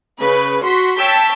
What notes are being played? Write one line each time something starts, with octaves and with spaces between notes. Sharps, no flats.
C#3 B4
F#4 C6 B6
C#5 G5 A5 E6 G6 B6